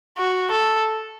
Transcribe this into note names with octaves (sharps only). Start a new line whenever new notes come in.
F#4
A4